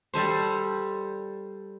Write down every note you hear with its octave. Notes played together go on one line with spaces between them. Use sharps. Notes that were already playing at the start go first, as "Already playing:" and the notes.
G3 A4 C5